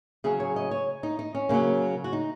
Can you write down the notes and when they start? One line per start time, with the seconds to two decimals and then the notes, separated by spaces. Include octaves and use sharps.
0.24 C#3 F#3 G#4
0.40 C#5
0.56 D#5
0.71 C#5
1.03 D#4
1.19 D#4
1.35 C#4
1.49 C#3 F#3 A#3
2.04 F#4
2.13 D#4